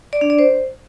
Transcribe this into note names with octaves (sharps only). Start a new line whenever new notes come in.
D5
D4
D5
C5